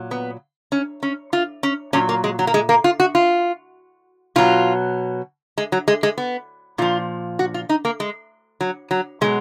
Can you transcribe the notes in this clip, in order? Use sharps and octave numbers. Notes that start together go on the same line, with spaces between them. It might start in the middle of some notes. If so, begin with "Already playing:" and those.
Already playing: A#2 F#3
B3
C#4
C#4
F4
C#4
A#2 F#3 C#4
A#3
G#3
F#3
A#3
G#3
A#3
F4
F#4
F4
B2 F#3 F4
G#3
F#3
G#3
G#3
B3
A#2 F3 F4
F#4
F4
D#4
A#3
G#3
F#3
F#3
B2 F#3 G#3